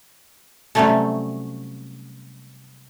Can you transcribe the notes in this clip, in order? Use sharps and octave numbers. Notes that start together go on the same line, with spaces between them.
C3 F#3 G3 A3 C#4 A4